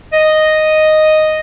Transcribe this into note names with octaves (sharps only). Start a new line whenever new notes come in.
D#5